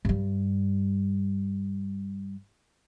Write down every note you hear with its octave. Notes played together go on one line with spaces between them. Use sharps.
G2 G3